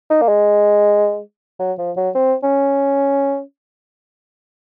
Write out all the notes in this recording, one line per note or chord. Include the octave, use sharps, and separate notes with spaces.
D#4
A#3
G#3
F#3
F3
F#3
C4
C#4